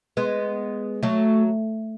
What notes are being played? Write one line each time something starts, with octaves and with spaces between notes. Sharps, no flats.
G#3 B3
F#3 A3